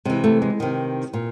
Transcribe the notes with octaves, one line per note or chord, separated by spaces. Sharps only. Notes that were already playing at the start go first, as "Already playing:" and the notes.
C3 E3 G#3
A3
G#3
C3 D#3
A#2